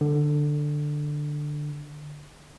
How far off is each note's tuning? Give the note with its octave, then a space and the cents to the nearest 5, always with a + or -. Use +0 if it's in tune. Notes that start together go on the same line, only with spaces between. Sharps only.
D3 +10